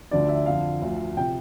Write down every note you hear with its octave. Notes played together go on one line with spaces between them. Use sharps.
D2 D3 F3 D5
E5
F2 D3 F3 F5
D2 D3 F3
C3 F3 G5